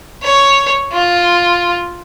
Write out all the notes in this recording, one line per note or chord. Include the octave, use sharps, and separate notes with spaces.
C#5
F4